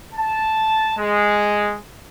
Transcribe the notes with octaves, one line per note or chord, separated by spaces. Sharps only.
A5
G#3